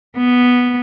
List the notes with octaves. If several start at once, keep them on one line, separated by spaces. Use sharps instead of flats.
B3